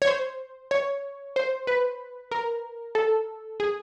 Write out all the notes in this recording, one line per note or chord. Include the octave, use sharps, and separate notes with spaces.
C#5
C5
C#5
C5
B4
A#4
A4
G#4